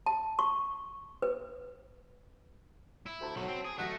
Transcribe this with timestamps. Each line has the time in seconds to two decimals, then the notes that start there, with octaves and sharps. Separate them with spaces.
0.06 A5
0.39 C#6
1.22 B4
3.06 E4
3.21 D2 C5 A5
3.36 B1 F#3 A4
3.48 C4
3.65 G#4
3.78 A1 F#3 A3 F#4 A#6